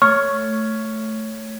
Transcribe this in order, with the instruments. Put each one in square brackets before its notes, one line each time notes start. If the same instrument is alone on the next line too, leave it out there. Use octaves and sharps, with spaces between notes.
[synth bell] A3 [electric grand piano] C#5 [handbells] C#6 [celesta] F6